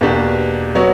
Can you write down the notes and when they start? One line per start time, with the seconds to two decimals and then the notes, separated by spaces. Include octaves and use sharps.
0.01 E2 B2 A#3 D4 G4
0.75 F#3 B3 F#4 C#5